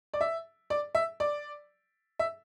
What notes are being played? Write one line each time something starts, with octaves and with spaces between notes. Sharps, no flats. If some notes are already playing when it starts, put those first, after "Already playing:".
D5
E5
D5
E5
D5
E5